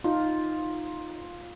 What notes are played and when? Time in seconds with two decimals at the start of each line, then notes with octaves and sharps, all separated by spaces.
0.04 D#4 F4